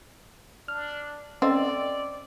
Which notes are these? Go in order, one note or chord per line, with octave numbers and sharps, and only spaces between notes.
D4 F6
C4 C#4 A4 D5 D#5 E6